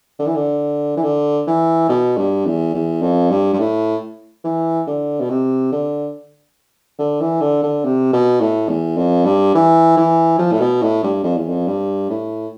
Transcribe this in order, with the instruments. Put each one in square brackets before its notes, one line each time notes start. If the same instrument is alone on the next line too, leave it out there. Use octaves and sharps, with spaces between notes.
[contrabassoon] D3
E3
D3
E3
D3
E3
B2
G2
E2
E2
F2
G2
G2
A2
E3
D3
B2
C3
D3
D3
E3
D3
D3
C3
B2
A2
E2
F2
G2
E3
E3
F3
A2
B2
A2
G2
F2
E2
F2
G2
A2